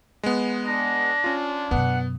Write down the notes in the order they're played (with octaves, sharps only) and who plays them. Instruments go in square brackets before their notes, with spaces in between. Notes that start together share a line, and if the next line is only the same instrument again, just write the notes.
[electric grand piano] G#3 B3
[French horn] D4 [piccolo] A#6
[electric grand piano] C#4 F4
[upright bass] F#2 B2 [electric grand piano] B3 [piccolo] F#5